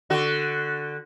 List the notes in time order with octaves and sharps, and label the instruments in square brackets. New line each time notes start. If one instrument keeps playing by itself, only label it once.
[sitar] D3 F#4